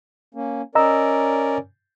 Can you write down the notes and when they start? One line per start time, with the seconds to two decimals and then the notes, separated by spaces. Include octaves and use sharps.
0.35 A#3 C#4
0.75 C#4 A#4 D5 D#5 A#5 E6